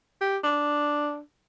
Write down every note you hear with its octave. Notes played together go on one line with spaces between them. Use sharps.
G4
D4